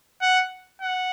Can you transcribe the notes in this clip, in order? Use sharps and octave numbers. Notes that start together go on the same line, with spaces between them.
F#5
F#5